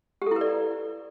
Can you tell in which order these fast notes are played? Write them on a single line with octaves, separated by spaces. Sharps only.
G4 A4 E4 B4 D5